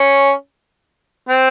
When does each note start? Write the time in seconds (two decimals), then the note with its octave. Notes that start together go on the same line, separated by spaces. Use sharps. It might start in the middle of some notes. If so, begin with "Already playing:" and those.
Already playing: C#4
1.29 C4